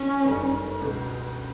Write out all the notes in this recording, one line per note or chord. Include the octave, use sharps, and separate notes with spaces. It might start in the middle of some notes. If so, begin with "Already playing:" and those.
Already playing: C#4
G1 F#2 D#3 G3 B3
C#2 B2 G#3